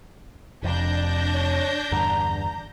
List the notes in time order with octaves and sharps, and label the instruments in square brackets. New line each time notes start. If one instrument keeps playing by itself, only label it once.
[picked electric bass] F1 F2 C3 [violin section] D4 G6 A#6
[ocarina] C#5
[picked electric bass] E2 G2 D3 [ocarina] A#5